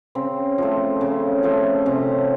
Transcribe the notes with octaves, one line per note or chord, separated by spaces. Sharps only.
C#3 C4
F3 A3
C#3
F3 A3
C3 C#4